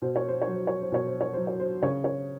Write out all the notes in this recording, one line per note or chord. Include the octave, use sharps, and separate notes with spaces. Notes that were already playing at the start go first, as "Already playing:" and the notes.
B2 C5
C#5
C5
C#5
F#3
C5
C#5
C5
B2 C#5
C5
C#5
F#3 C5
C#5
C5
C#3 C#5
C#5